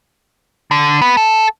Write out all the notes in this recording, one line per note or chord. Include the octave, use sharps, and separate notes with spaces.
D3
B3
A4